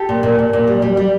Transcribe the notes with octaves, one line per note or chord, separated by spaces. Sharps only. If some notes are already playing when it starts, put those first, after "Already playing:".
Already playing: G4 A4
A#2
A#2
A#2
A#2
G3
G3
G3